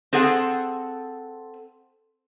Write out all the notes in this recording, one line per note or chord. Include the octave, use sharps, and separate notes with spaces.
C4 G#4 A4 F#5